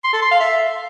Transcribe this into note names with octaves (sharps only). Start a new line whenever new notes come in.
C6
A4
C6
F5
E5